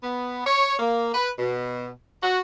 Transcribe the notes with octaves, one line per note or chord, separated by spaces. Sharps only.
B3
C#5
A#3
B4
B2
F#4